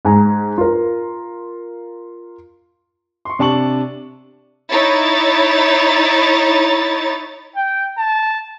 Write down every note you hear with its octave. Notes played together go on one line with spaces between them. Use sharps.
G#2 G#5 A#5
F4 A#4
C6 C#6
C3 D4 A5 C#6 F#7
D#4 E4 C#5 A6
G5
A5